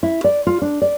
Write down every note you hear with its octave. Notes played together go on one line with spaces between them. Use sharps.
E4
D5
F4
D4
D5